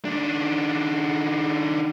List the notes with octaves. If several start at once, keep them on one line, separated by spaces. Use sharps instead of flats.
D#3 D4